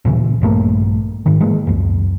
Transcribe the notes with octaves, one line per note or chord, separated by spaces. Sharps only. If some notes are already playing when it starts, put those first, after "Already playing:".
D#2 A#2 C#3 E3
A#1 G2 A3 A#3
G#2 D#3
E3 G#3 A#3
C#2 F#2